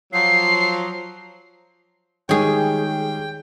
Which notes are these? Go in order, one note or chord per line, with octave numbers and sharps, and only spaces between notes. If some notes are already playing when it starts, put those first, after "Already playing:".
F3 F#3 C7
D#3 G3 G#3 G#4 C#5 G5